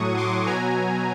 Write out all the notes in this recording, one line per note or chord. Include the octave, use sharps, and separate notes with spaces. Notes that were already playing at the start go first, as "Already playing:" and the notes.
Already playing: A2 F#3 C#6 D#6
C6 D6
B2 F#3 G#5 A#5